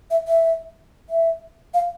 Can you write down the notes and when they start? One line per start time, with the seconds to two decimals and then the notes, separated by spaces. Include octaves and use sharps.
0.10 E5
0.27 E5
1.09 E5
1.74 F5